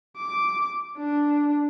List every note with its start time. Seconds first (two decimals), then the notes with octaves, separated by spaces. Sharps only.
0.16 D6
0.97 D4